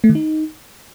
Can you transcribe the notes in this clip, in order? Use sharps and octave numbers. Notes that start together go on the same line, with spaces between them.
A3
D#3
D#4